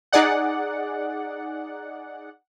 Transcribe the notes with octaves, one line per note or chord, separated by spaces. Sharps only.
D#4 G#4 D5 F#5